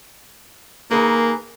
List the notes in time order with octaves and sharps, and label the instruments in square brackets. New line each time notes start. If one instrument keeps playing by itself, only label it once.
[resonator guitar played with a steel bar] D#3 G#4 B4 [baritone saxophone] A#3